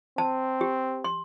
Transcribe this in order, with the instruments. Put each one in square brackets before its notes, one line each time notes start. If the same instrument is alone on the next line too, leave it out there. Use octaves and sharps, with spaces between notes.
[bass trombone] C4 [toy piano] A5
[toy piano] G4
C6